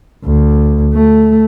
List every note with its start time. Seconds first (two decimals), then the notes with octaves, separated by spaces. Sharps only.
0.25 D2
0.94 A3